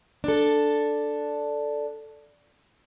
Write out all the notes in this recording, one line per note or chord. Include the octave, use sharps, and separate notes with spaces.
D4 A4